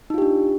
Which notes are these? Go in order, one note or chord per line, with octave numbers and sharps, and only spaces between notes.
D4 D#4 F4 G4